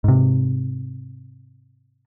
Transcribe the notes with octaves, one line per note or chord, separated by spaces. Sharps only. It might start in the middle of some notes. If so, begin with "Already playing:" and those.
G#2 C3